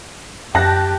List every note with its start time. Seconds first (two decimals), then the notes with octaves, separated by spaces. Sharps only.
0.55 F#2 G4 A5 F#6 A#6